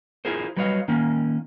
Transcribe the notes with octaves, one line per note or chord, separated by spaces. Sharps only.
E4 F4 G#4 A#4 C5
F#3 G3 B4 C#5 D#5 F5
D#3 A#3 C#4